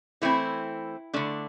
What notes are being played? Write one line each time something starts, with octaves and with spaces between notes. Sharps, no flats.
E3 A3 C4 E4
D3 A3 D4